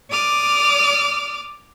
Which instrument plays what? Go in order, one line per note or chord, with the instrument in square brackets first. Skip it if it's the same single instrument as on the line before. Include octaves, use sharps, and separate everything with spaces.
[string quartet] D5 D6 D#6 F6